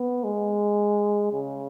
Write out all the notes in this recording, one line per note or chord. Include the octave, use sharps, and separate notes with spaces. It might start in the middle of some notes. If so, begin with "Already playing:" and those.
Already playing: B3
G#3
C#3